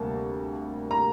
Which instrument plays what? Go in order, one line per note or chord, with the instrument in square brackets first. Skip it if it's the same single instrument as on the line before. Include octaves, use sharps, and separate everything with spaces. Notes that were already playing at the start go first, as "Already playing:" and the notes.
Already playing: [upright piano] D2 C3 G3 A#3 A5
A#5